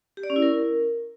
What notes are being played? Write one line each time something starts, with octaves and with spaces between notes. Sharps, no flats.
G4
D5
C#4
E4
A#4